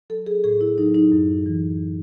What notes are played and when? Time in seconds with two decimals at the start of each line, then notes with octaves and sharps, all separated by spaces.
0.10 F#3 A4
0.27 G#4
0.44 A2 G#4
0.61 E4
0.78 F#3 D#4
0.94 D#4
1.12 F#2
1.46 E3